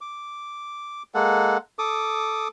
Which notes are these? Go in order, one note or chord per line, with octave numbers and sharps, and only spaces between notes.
D6
G#3 A#3 A4 F#5
A4 D6 D#6